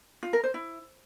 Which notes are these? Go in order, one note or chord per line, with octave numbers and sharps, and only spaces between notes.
F4
A#4
C5
E4